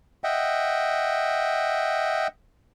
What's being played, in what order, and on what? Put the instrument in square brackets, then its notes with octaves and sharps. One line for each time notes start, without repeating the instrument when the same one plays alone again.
[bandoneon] D#5 E5 F#5 G5